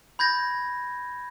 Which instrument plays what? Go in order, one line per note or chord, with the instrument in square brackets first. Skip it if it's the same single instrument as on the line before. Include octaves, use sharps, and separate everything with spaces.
[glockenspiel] B5 G6 G#6 A#6